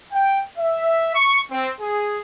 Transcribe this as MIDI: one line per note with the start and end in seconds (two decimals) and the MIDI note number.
0.13 0.40 79
0.58 1.13 76
1.15 1.38 85
1.51 1.71 60
1.81 2.21 68